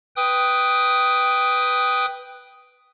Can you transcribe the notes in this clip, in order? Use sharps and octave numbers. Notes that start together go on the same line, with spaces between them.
B4 G5 D#6